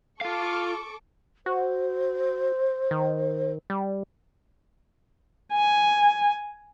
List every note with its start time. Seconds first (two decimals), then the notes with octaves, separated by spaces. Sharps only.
0.21 F4 A4 F5 C#6 D6
1.46 F#4 C5
2.91 D#3
3.70 G3
5.53 G#5